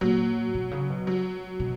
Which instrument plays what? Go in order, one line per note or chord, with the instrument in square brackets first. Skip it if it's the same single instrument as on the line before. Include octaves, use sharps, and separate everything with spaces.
[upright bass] A#2 [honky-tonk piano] F#3
[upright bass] B2
C#3
B2
[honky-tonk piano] F#3
[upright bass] B2